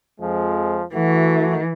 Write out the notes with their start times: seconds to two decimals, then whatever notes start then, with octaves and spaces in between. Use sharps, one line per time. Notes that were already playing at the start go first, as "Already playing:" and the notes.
0.20 F2 F3 G#3
0.94 E3 A3 F#4